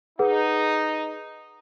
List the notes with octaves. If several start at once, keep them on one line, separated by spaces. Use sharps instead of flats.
D#4 G#4 B4 F#5